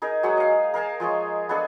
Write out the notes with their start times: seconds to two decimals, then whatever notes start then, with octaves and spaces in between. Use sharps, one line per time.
0.02 D#4 G#4 A#4
0.23 F#3 G#3 G#4 F#5
0.37 D#5 F5
0.74 A#4 F5 G#5 A5
1.00 F3 G#3 G#4 C#5
1.49 B3 D4 G#4 A4